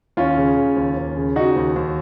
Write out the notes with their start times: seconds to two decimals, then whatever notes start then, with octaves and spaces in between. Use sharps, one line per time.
0.17 D#2 C#4 F4
0.37 C#3
0.57 C#3
0.76 D#2
0.97 D#2
1.17 C#3
1.36 C#3 D#4 F#4
1.56 D#2
1.76 D#2